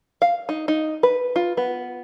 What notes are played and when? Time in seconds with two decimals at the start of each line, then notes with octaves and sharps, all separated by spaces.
0.22 F5
0.49 D#4
0.68 D#4
1.03 B4
1.36 F4
1.57 B3